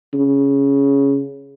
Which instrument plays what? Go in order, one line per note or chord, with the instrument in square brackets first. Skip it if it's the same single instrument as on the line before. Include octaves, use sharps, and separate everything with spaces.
[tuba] C#3